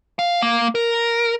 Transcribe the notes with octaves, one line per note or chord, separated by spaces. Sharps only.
F5
A#3
A#4